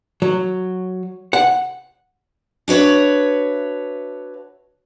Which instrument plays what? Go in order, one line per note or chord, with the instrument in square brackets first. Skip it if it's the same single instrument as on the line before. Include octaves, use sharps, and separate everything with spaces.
[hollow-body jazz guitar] F#3
F#5
[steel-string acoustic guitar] D4 F#4 B4 C#5 E5